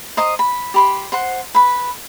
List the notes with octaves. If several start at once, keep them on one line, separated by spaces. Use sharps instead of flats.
C5 D#5 A#5 D#6
B5
G4 B5 C6
C5 F#5 C6
B4 B5